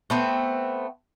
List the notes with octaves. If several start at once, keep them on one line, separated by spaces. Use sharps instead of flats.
A3 B3 C4